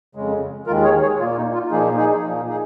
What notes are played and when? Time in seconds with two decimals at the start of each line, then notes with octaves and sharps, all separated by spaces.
0.15 F2 C#3 G#3
0.67 D#2 D#3 G#3 F4 A#4
0.84 G#4 C#5
1.02 G#4 C#5
1.19 A#2 A#3 F4
1.37 D#4
1.54 F4
1.71 A#2 F3 A#3 D#4 G#4
1.97 D#4 G#4
2.23 A#2 F3 A#3
2.49 D#4 G#4